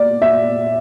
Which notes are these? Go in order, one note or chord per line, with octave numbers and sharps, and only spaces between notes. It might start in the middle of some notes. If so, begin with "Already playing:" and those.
Already playing: A#2 D5
E5